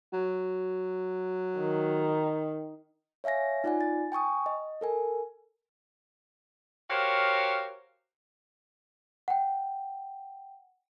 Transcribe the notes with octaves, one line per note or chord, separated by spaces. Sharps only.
F#3
D#3
C#5 E5 F5 G#5 A#6
D#4 F4 D5 F#5 G#5
A6
G5 G#5 C#6 D#6
D#5
A4 A#4 G#5
F#4 G4 A#4 C5 C#5 F5
F#5 G5